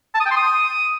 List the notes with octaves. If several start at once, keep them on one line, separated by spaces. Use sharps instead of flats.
A5
D#6
G5
C6
D#6